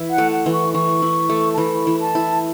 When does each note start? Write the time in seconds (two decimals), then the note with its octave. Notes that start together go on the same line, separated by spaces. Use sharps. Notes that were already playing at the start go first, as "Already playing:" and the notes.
Already playing: E3 E4
0.10 F#5
0.18 A3
0.31 F#5
0.46 E3
0.52 C#6
0.73 E3 C#6
1.02 E4
1.29 A3
1.54 A5
1.58 E3 B5
1.87 E3
2.00 A5
2.15 E4